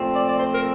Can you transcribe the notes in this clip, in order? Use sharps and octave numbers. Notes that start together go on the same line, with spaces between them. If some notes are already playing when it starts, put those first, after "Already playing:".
Already playing: A#2 F3 A3 C4
D5
D5
C5
A#4